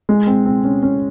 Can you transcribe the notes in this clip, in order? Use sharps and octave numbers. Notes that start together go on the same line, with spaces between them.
G#3
C4
C4
C#4
C#4